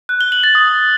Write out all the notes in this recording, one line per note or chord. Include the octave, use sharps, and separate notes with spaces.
F#6
G7
F#7
A6
D#6